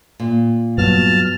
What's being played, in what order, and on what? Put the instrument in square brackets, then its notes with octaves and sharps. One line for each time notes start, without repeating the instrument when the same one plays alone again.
[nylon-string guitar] A#2
[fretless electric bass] G2 F#3 B3 [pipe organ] A5 F6